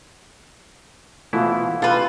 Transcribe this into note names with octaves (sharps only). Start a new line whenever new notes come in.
B2 E3 A3 E4 F4
C3 F4 A4 B4